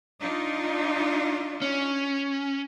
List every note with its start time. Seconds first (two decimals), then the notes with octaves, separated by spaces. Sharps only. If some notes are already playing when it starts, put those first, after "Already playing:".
0.20 D4 D#4 F4
1.62 C#4